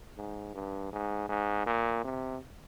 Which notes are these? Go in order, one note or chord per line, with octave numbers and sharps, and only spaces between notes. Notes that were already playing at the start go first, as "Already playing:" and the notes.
G#2
G2
G#2
G#2
A#2
C3